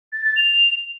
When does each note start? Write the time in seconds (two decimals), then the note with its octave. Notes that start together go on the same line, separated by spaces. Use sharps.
0.13 A6
0.24 A6
0.36 F7